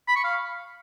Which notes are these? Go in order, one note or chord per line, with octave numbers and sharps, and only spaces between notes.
B5
C#6
F5